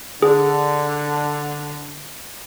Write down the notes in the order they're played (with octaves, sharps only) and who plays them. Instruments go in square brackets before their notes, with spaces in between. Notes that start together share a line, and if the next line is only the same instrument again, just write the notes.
[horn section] D3 [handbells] G#4